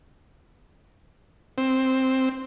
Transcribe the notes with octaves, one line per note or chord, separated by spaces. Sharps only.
C4